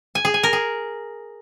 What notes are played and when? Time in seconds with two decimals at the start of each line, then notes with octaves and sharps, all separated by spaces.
0.15 G#5
0.25 G#4
0.34 G#5
0.43 A#4
0.53 G#4